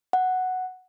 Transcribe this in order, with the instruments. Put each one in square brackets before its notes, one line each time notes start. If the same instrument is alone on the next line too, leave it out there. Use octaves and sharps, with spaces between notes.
[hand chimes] F#5